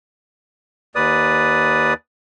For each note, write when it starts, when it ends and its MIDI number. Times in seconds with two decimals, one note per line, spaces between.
0.95 1.94 39
0.95 1.94 71
0.95 1.94 74
0.95 1.94 87